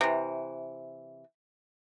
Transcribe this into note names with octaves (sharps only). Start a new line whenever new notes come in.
C3 E3